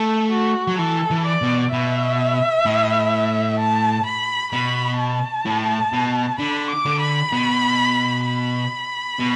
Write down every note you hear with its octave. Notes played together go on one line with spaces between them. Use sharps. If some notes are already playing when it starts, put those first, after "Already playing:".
Already playing: A3 A4
F#4
F#3
E3 A4
E3
D5
B2
B2 E5
A2
A5
B5
B2 B5
A5
A2
B2
D3 B5
D6
D3
B5
B2
B5
B2